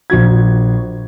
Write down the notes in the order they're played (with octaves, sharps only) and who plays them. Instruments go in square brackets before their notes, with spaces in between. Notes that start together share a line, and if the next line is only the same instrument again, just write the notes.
[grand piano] A#1 F#4 G#6